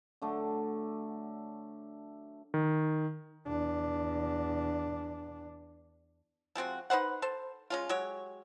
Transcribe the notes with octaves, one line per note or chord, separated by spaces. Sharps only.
D3 F#3 A3 D4
D#3
E2 D4
F3 G#3 C4 F#4
D#4 B4 C5 F#5
A4 C5
G#3 C#4 F4
F#3 G#3 G4 C#5